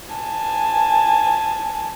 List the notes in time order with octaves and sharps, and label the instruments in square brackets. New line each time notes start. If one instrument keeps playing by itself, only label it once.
[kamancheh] G#5 A5